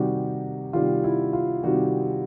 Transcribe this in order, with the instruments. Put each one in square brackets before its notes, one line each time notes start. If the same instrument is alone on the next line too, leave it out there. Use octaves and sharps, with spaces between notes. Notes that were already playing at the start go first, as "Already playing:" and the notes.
Already playing: [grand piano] C3 D#3 G3 F#4
C3 D#3 G3 F4
E4
F4
C3 D#3 G3 F#4